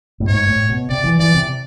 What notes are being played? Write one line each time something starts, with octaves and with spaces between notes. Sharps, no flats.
A2
G#2 C#5
A2
B2
C3 D5
E3
E3 D5
C3